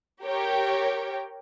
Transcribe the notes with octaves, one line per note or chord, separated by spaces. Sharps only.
G4 A#4 C#5 G5